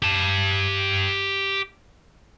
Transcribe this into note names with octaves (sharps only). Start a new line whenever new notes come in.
G4 A5